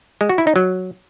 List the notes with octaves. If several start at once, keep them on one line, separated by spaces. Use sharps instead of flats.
G#3
F#4
E4
D#4
F#3